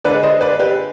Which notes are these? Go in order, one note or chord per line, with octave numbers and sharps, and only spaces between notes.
D3 G#3 B4 D5
C5 D#5
B4 D5
G4 B4